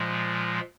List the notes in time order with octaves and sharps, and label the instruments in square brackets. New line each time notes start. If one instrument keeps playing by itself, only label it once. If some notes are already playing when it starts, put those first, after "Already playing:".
Already playing: [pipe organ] A#2 F3 G#3